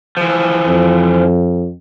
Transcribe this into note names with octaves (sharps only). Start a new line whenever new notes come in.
E3 F3
F2